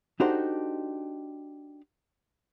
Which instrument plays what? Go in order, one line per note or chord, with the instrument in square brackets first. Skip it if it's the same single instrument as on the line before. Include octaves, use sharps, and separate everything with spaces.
[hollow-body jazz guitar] D4 D#4 F#4 G4 A4 C5